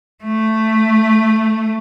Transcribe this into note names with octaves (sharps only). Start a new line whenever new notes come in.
A3